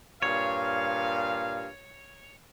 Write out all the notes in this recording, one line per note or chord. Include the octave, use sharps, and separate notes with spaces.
G2 A#2 C#5 F5